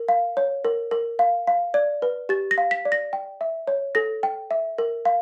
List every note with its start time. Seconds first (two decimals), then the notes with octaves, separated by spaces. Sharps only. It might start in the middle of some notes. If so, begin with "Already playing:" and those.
Already playing: A#4
0.08 F5
0.37 C#5
0.65 A#4
0.91 A#4
1.19 F5
1.47 F5
1.74 D5
2.02 B4
2.29 G4 A6
2.51 A#6
2.58 F5
2.71 B6
2.85 D5
2.92 A#6
3.13 G5
3.41 E5
3.67 C#5
3.95 A4 A#6
4.23 G5
4.51 E5
4.78 A#4
5.05 F5